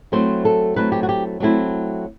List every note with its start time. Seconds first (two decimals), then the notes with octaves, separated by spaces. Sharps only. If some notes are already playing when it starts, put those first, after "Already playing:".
0.12 F#3 A3 C4 E4 C5
0.45 A4
0.76 F#3 A3 C4 E4 B4
0.92 G4
1.03 F#4
1.09 G4
1.40 F#3 A3 C4 E4